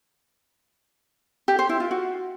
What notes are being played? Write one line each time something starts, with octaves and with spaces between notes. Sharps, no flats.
G4
C5
E4
F4
F#4